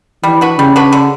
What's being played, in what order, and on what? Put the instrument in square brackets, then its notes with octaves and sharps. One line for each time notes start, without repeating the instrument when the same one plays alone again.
[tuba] E3 [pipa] G3
[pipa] D4 F#4 B4
[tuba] C#3 [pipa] G3
[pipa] D4 F#4 B4
D3